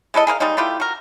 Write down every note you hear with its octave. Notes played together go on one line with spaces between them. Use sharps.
G#3 E4 A4 D#5
G#4 A#4 C5 F5
G3 G#3 A#3 D#4
A3 E4 F4 G4
F#4 A#4